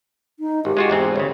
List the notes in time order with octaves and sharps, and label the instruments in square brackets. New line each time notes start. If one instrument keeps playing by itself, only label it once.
[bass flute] D#4
[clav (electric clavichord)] G#1 [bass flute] G4
[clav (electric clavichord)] G#3 F4 F#4
E2 G#2 C4
[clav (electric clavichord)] G1 C#3 [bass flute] C#5